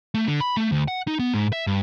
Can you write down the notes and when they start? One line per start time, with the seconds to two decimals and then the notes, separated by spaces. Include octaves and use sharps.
0.14 A3
0.28 D3
0.41 B5
0.57 A3
0.72 D2
0.88 F#5
1.07 D#4
1.19 B3
1.34 G#2
1.53 E5
1.67 G2